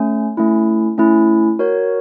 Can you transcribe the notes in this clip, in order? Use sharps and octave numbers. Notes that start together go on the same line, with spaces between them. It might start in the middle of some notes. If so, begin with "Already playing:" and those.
Already playing: A3 C#4
A3 C#4 E4
A3 C#4 E4
F#4 A#4 C#5